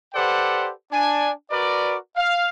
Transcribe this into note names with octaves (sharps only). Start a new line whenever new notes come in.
G4 A4 B4 C5 D5 F#5
D4 G#5
F#4 A#4 B4 D5
F5